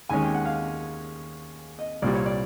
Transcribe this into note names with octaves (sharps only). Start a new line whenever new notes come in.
D#2 D#3 G#3 C#4 G#5
G5
F#5
F5
D#5
C2 A#2 G3 D5
C#5
D5